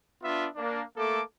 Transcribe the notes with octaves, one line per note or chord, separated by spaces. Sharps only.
B3 D4 F4 E5
A#3 D4
A3 A#3 A4 D6